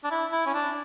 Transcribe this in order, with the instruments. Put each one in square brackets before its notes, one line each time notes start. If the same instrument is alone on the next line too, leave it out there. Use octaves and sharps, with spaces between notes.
[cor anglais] D4
E4
E4
C#4
D4